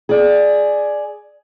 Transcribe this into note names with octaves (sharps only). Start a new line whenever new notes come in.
G#4 D5